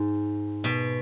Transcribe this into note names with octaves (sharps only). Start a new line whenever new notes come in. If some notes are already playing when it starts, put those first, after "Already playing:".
Already playing: G#2
B2